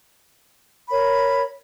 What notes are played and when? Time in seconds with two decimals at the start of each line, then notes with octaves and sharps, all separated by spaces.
0.90 A#4 C#5 B5